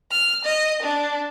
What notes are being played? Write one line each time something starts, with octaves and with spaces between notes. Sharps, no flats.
F6
D#5
D4